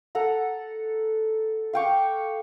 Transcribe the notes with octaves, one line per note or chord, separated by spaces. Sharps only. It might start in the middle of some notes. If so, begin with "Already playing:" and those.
A4 F#5 A#5
F5 G5 C#6 D6